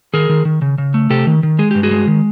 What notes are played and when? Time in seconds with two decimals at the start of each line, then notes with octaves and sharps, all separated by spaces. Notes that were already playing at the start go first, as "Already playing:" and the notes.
0.13 D#3 G#4 A#4
0.29 D#3
0.45 D#3
0.62 C#3
0.78 C#3
0.94 A3
1.10 C3 G4 A4
1.27 D#3
1.43 D#3
1.59 G#3 G#4
1.71 G2 G4
1.83 F#4 G#4
1.91 G#3
2.07 D#3